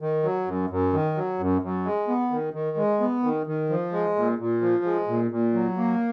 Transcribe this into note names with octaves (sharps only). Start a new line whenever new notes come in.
D#3
F#3
F#2
F#2
D#3
F#3
F#2
F#2
G#3
B3
D#3
D#3
G#3
B3
D#3
D#3
F3
G#3
A#2
A#2
F3
G#3
A#2
A#2
F#3
A#3